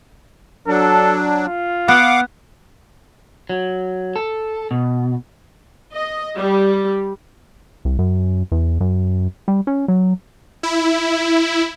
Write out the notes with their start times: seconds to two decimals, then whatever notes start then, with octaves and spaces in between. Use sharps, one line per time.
0.68 F#3 D4 A4
1.43 F4
1.88 B3 F5 F#5 D6
3.49 F#3
4.16 A4
4.71 B2
5.94 D#5
6.36 G3
7.85 C2
7.98 F#2
8.52 E2
8.81 F#2
9.48 G3
9.67 C#4
9.88 F#3
10.63 E4